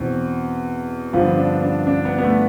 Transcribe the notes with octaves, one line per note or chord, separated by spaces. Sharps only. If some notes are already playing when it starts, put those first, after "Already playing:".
Already playing: E2 B2 C4
G2 D3 F3 B3
D4
D4
D4
B3
B3
A3